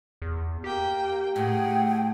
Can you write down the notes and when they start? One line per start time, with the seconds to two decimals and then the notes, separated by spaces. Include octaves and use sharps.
0.22 E2
0.64 A#3 G4 G5
1.36 A2 G#4 F#5 G5